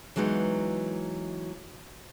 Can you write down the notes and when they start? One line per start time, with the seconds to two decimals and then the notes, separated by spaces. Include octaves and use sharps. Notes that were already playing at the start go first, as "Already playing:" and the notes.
0.16 E3 F#3 G#3 B3 D#4